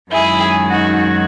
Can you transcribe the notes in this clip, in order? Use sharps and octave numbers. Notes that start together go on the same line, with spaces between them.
F#2 D#3 G#3 E4 G#4
D#4 F#4
F#4